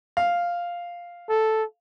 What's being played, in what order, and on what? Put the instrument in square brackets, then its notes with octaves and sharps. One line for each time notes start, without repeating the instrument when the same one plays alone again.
[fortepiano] F5
[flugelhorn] A4